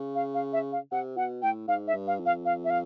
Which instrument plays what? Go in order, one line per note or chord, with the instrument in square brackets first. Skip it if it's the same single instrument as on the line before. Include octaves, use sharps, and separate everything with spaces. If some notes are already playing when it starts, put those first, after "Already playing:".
Already playing: [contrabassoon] C#3
[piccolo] F5
F5
E5
F5
[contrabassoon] C3 [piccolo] F#5
[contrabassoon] B2 [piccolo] F#5
[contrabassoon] A2 [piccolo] G5
[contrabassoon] G#2 [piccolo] F5
[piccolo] E5
[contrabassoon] G2
[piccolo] F5
[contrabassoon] F2
[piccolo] F5
F5
E5
F5